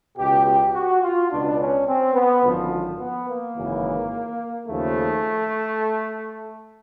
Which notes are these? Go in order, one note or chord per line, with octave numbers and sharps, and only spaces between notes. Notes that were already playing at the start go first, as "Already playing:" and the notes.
C#2 B2 G4
G4
F#4
F4
C#2 B2 D4
C#4
C4
B3
G#1 F#2 D3 F3
B3
A#3
G#1 F#2 C#3 E3
D#2 C#3 F3 A3